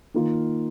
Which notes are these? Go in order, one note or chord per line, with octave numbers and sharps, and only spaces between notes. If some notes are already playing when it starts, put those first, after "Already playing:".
D#3 A#3 F4